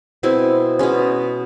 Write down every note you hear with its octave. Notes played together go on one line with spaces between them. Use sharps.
B2 G#3 C4 E4
B2 G#3 C#4